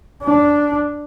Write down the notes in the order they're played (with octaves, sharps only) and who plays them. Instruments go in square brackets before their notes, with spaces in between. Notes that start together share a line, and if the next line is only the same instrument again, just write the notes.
[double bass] D4